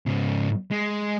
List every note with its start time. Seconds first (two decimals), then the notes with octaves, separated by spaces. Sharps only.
0.06 G#2 C#3
0.71 G#3